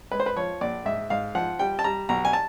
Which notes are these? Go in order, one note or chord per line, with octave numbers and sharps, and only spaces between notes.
G#3 B4
C5
B4
F3 C#5
A#1 D5
G#2 E5
G#2 F5
F3 F#5
G3 G5
A5
G3 A#5
B1 A#5
G#5
A5